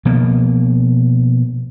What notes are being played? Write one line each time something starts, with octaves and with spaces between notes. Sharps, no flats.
B2 F3 A#3